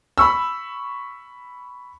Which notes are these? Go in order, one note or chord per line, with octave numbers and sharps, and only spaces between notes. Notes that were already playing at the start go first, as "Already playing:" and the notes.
B5 C#6 E6